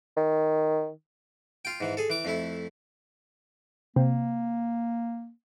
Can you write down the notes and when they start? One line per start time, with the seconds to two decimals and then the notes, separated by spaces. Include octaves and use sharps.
0.17 D#3
1.65 F4 G5
1.81 G#2 E3
1.97 G#4 A4
2.10 E3 D6
2.25 F2 A3 E4
3.96 C3 A#3